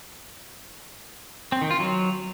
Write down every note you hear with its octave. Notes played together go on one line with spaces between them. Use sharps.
C4
D#3
F4
F#3